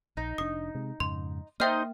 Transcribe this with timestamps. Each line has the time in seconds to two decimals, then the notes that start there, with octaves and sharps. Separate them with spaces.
0.17 A#1 D#4
0.38 F1 D4 D#6
0.75 C3 G#3
1.00 F2 G#2 C#3 C6
1.60 A#3 D#4 C5 D#5 E5 G5 F6